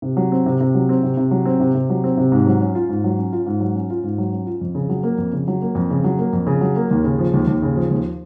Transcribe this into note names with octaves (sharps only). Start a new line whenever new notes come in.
C3
F#3
C4
C3
C3
F#3
C4
C3
C3
F#3
C4
C3
C3
F#3
C4
C3
G#2
F#3
C#4
F4
G#2
F#3
C#4
F4
G#2
F#3
C#4
F4
G#2
F#3
C#4
F4
F2
C#3
F#3
A#3
F2
C#3
F#3
A#3
F2
C#3
F#3
A#3
F2
C#3
F#3
A#3
D#2
C#3
F3
D#2
D#2
C#3
F3
D#2